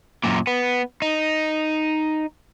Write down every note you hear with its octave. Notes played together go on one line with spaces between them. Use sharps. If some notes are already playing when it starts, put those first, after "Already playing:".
F#2 A#2
B3
D#4